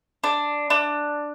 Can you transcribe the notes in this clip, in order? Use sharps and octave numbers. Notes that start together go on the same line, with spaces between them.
D4
D4